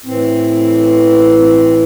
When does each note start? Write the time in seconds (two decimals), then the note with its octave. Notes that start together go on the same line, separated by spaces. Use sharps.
0.05 A2 E3 C4
1.39 C4